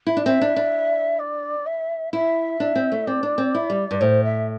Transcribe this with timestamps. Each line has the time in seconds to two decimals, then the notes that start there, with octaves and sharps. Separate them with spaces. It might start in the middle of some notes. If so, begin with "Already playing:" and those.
0.07 E4
0.17 D4
0.26 C4 E5
0.41 D4
0.56 D4
1.19 D5
1.66 E5
2.13 E4 E5
2.60 D4
2.76 C4
2.92 A3
3.07 C4 D5
3.23 D4
3.38 C4
3.55 E4
3.70 G3
3.91 G2
4.01 A2 C5
4.24 E5